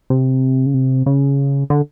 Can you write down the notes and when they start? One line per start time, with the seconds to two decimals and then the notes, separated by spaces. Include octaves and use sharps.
0.10 C3
0.66 C#3
0.74 C3
1.06 C#3
1.70 D3